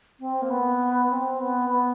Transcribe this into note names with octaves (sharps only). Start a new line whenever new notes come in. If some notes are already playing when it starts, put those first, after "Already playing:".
C4
A#3
B3
C4
B3
B3